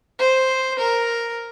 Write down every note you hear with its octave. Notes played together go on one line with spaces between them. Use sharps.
C5
A#4